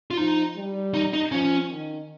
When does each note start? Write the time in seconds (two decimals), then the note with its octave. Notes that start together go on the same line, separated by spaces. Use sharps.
0.11 F4
0.17 F3 D#4
0.55 G3
0.94 D#4
1.13 D#4
1.32 F3 C#4
1.71 D#3